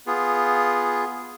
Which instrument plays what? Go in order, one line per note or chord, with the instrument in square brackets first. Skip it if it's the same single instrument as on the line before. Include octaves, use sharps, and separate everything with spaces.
[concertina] B3 F4 G#4